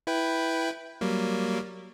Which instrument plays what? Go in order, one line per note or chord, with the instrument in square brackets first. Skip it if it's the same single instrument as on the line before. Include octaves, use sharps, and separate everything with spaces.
[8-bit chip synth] E4 B4 G5
F#3 G3 A#3